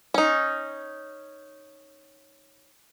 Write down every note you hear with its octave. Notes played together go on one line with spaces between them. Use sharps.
C#4 D#4